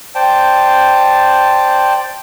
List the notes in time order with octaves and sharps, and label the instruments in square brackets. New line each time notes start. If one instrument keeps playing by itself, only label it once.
[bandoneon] C5 D5 G5 A5